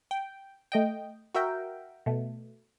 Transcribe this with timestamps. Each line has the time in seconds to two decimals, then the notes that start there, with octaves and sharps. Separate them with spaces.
0.11 G5
0.72 A3 D#5 G5
1.35 F#4 A#4 E5 G5
2.06 B2 A3